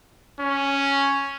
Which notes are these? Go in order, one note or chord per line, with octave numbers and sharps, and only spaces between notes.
C#4